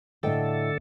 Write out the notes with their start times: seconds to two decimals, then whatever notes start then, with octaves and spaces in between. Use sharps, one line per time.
0.23 A2 D3 A4 D#5 G5